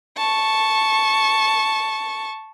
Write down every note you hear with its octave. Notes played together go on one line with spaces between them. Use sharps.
A5 C#6